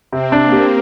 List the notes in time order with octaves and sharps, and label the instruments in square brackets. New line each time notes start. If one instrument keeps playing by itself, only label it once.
[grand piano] C3 [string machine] C4
[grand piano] D4
[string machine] A#3
[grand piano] G4